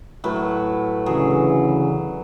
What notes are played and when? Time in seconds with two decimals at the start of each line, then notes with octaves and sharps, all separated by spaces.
0.24 A2 F#3 B4
1.06 D2 C#3 E3 F#3 G#4